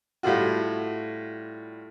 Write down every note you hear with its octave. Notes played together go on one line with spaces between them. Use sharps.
A2 G3 F4 F#4